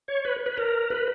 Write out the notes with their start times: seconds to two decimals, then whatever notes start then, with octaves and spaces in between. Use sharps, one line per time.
0.08 C#5
0.25 B4
0.46 B4
0.58 A#4
0.90 B4